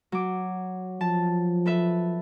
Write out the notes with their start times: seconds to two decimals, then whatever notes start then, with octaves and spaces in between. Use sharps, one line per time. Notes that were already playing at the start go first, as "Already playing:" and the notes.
0.12 F#3 D6
1.01 F3 A5
1.66 A4 B4 E5